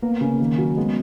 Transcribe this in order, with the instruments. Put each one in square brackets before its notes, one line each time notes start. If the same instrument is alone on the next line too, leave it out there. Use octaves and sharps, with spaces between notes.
[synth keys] A#3 [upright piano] B3
[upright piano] C#3
D#3
F#3
[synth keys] G#3 B3 [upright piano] C#4